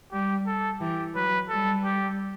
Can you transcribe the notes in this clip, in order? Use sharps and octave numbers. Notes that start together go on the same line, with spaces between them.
G3 G4
A4
E3 G4
F#3 B4
G3 A4
G4